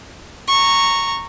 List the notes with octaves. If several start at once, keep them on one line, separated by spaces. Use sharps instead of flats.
A#5 C#6